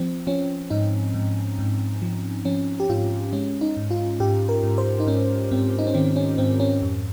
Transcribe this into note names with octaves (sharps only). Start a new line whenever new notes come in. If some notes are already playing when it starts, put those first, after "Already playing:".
Already playing: F3 C4
F3 C#4
G#2 D#4
G#2
G#2
F3
F3 C#4
G4
G#2 F4
G#3 C#4
D#4
G#2
F4
G#2 G4
A#4
G#2
C5
D#4
G#2 C#4
G#2 C4
D#4
C#4
D#3 C4
C#4
G#2 C4
C#4
F2